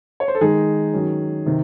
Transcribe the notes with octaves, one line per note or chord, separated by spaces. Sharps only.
C#5
C5
A4
D#3 G#3 D#4 G#4
D#3 F#3 C#4
C3 D#3